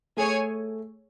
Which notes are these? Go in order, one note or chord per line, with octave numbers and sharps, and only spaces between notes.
A3 G#4 C#5 G#5